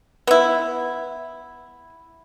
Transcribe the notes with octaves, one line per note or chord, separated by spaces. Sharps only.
B3 E4